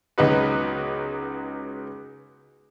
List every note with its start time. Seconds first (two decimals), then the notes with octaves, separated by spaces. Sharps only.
0.18 C#2 F#3 B3 D#4 F#4 B4